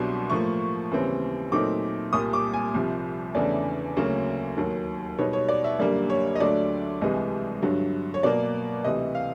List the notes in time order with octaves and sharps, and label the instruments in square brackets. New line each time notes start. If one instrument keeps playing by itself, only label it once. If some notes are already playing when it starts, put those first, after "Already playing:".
Already playing: [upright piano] C2 B2 F#3 B3 D4 C6
A2 F3 A#3 C#6
D#2 C#3 E3 G3 C4
A#2 F#3 A3 C4 D#4 D6
C2 A#2 G3 D#6
D6
G#5
C2 C3 F3
E2 C#3 E3 A3 D4 D5
D2 C#3 F#3 A#3 C#4
D#2 D#3 F#3
B2 G3 B3 D#4 C#5
C#5
D5
E5
F#2 D3 G3 A#3 D5
C#5
D#5
D2 D3 F#3 A3 D4 D5
C2 C3 E3 G#3 D#5
G2 D3 F#3
C#5
B2 F#3 A#3 D5
D2 C3 E3 D#5
F5